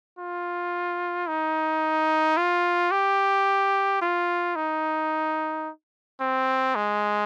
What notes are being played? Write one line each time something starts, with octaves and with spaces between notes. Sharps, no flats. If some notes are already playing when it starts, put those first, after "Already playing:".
F4
D#4
F4
G4
F4
D#4
C4
G#3